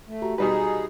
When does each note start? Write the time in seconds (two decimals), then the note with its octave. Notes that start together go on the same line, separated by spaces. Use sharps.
0.07 A3
0.22 F#4 G4 A#5
0.38 B2 G3 D#4 G#4 B4